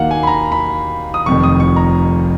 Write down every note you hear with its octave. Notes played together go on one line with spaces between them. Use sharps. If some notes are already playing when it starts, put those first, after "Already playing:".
Already playing: D#2 D#3 F#3 A#3 D#4 F5 F#5
G#5
B5
A#5
B5
D#6
F1 F2 D#3 C#6
D#6
C#6
A#5